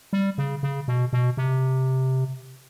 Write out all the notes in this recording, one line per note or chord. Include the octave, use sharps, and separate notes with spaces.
G3
C#3
C#3
B2
B2
C3